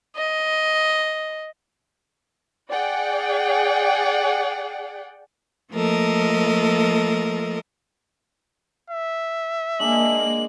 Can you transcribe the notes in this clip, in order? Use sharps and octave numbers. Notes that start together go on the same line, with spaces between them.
D#5
G#4 D5 F#5 G5
F3 A3 A#3 A4 A#4 D#5
E5
G#3 A#3 D4 F#7